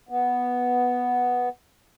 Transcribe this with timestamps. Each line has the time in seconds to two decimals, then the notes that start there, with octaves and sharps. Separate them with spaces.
0.09 B3